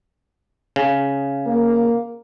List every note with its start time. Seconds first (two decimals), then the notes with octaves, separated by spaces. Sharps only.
0.76 C#3
1.46 A#3